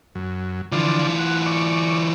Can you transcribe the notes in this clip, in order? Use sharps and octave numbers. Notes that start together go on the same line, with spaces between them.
F#2
D3 E3 F3 F4 D5
F#5
D5 C#6